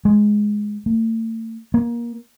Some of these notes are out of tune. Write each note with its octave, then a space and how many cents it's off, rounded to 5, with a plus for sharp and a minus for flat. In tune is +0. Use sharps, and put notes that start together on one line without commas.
G#3 +5
A3 +40
A#3 +20